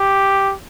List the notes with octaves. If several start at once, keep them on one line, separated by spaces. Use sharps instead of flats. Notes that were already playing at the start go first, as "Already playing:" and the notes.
Already playing: G4